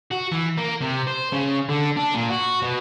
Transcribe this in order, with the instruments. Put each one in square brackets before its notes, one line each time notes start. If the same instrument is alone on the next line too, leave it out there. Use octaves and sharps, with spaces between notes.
[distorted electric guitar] F#4
E3
A#3
C3
C5
C#3
D3
D4
A#2
F#4
B2